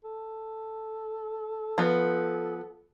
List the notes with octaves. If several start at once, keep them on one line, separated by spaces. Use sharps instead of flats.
A4
F3 B3